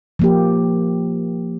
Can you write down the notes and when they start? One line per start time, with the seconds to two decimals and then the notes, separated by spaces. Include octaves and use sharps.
0.19 F3 A#3 G4